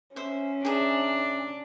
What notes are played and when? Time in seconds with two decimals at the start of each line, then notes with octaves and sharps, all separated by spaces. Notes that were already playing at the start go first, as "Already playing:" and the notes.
0.16 C#4 C5 E5
0.65 D4 G#4 E5 A#5